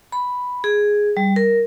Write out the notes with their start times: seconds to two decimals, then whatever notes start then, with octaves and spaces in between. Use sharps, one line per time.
0.12 B5
0.64 G#4
1.17 G3
1.36 A#4